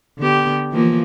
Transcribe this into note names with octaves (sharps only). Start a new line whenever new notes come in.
D3 B3 G4
E3 F3 A#3